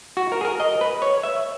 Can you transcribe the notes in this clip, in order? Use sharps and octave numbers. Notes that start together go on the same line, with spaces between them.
F#4
A#4
G#4
A#4
D#5
B4
C#5
E5